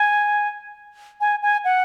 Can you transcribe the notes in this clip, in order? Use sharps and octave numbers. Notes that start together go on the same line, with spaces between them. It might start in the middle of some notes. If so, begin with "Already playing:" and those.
Already playing: G#5
G#5
G#5
F#5